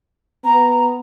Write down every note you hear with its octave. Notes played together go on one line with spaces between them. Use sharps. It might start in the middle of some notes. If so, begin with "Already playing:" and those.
B3 A#5